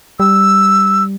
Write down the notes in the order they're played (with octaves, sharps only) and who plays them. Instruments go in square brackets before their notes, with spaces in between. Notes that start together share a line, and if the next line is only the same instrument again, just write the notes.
[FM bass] G3 [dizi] E6